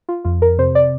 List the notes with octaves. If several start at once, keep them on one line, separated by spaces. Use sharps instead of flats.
F4
F2 F4
A#4
C3 C5
D5